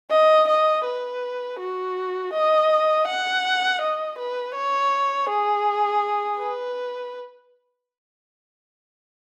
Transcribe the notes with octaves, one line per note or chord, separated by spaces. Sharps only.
D#5
D#5
B4
F#4
D#5
F#5
D#5
B4
C#5
G#4
B4